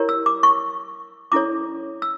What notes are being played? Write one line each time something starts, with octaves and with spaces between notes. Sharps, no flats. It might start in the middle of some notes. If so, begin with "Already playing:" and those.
Already playing: E4 G4 A#4 C#5
E6
D6
C#6
C#4 E4 A4 C#5 D6
E6